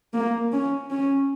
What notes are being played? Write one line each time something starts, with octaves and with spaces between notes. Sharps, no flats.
A#3
C#4
C#4